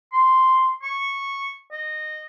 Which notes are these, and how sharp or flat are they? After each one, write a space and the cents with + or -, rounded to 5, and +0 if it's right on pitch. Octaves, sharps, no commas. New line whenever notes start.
C6 -5
C#6 -10
D#5 -15